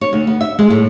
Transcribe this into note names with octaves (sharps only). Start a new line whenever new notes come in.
C#5
D2
B3
E5
G#3
A2